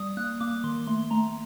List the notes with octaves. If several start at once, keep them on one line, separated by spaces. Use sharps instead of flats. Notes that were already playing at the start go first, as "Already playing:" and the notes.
Already playing: G3 D#6
A#3 F#6
A#3 D6
D#3 C6
A3 C6
A3 A#5